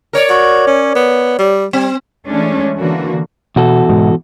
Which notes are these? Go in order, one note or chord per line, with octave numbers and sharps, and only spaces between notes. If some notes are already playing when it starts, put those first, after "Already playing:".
A#4 C#5 D5
F#4
C#4
B3
G3
G3 C4
E3 G#3 A3 C#4 D4
D3 E3 A#3 F#4
E2 B2 F#4 A4
G#2 B2 G#3